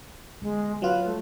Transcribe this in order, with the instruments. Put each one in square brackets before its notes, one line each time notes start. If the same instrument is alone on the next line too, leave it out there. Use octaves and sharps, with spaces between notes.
[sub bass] G1 [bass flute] G#3
[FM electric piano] F#3 F4 [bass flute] B4
[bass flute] A3